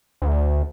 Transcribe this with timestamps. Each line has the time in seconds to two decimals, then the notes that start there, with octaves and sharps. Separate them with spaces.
0.22 D2